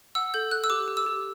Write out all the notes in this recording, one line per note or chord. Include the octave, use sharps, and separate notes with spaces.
F#5 E6
A4 G6
A4 F#6
E6
G4 D6
G4
E6
G4